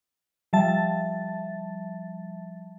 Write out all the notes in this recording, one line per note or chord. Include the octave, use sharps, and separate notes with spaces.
F3 G3 E5 A5 A6